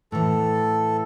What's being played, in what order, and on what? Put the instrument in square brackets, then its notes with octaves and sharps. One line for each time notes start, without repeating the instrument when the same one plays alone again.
[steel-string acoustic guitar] A2 E3 [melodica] A4